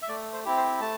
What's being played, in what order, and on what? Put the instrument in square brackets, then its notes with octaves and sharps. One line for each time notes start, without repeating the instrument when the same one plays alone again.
[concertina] E5
A3 D5
C5
C4 E4 G4
C5
A3 A5